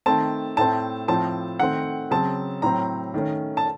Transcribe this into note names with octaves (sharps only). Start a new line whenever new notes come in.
D#3 A3 C4 A5
A2 A3 C4 A5
A2 F3 C4 A5
D#3 A3 C4 F#5
C#3 F#3 C4 A5
A2 F#3 C4 A#5
D#3 A3 C#4
A5